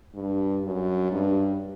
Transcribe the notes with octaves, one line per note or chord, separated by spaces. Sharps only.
G2
F#2
G2